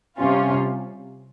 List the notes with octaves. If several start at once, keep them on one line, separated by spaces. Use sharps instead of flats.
C3 G3 C#4 F4